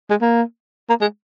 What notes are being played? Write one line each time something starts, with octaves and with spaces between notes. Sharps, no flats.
G#3
A#3
A#3
G#3